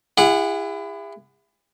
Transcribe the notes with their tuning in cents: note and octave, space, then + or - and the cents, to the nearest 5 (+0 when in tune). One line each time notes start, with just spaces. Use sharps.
E4 +25 G#4 -45 F#5 -10